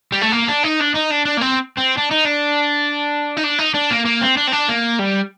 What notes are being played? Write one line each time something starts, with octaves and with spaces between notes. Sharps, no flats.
G3
A3
A#3
D4
D#4
D4
D#4
D4
D4
A#3
C4
C4
D4
D#4
D4
D#4
D4
D#4
D4
A#3
A#3
C4
D4
C4
D4
A#3
G3